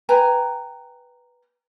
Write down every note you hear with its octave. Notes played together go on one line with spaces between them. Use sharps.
B4 G5 G#5 A#5